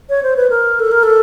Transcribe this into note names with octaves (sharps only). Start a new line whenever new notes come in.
C#5
C5
B4
A#4
A4
A#4
A4